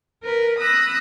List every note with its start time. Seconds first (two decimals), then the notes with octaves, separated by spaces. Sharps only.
0.23 A#4 B4
0.60 B5 D#6 E6 F#6 A#6